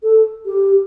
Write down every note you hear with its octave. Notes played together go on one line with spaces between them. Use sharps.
A4
G4